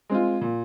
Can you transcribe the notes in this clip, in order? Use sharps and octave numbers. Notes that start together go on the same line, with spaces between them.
G#3 C4 F4
A#2